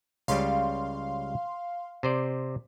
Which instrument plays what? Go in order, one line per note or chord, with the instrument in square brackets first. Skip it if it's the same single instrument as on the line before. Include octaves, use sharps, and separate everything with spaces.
[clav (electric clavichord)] C#2 C#3 G3 [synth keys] F5 C6
[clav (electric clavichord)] C3 C5 D5